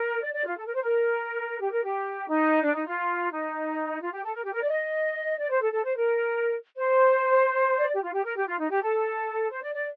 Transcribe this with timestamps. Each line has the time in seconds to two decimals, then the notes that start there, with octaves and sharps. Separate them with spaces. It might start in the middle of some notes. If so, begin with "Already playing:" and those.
Already playing: A#4
0.22 D5
0.33 D5
0.45 F4
0.57 A4
0.66 A#4
0.74 C5
0.83 A#4
1.60 G4
1.71 A#4
1.83 G4
2.28 D#4
2.63 D4
2.74 D#4
2.86 F4
3.31 D#4
4.01 F4
4.11 G4
4.23 A4
4.34 A#4
4.43 G4
4.52 A#4
4.61 D5
4.68 D#5
5.38 D5
5.49 C5
5.61 A4
5.72 A4
5.84 C5
5.95 A#4
6.76 C5
7.78 D5
7.93 G4
8.02 F4
8.13 G4
8.24 A#4
8.36 G4
8.47 F4
8.59 D#4
8.70 G4
8.81 A4
9.50 C5
9.62 D5
9.73 D5